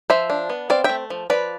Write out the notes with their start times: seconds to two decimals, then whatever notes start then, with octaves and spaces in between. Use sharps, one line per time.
0.10 F3 C5 E5
0.30 D4
0.50 B3
0.70 C4 D5 F5
0.84 A3 E5 G5
1.10 F3
1.30 F3 B4 D5